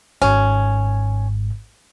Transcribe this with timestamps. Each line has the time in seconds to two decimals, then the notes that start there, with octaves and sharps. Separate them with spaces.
0.22 G#1 G#2 C#4